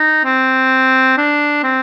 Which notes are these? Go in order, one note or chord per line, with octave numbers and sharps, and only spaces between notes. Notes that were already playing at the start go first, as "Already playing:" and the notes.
Already playing: D#4
C4
D4
C4